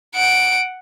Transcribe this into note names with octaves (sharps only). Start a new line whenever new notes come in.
F#5 D7